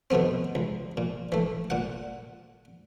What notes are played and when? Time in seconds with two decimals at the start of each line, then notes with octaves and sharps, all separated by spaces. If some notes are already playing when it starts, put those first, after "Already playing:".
0.10 B2 D#3 A3 B3 C4
0.55 C#2
0.97 A#2
1.32 E3 A3
1.70 A#2 F#5